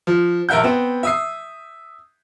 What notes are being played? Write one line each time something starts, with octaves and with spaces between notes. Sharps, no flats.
F3
A#1 A#4 E5 F#5 G6
B3 C4
E5 D#6 C7